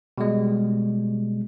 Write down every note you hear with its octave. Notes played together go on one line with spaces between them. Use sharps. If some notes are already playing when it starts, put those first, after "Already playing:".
B2 G3 G#3